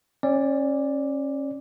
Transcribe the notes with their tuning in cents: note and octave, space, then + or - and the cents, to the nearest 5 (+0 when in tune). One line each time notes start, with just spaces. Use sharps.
C#4 -30 D5 +0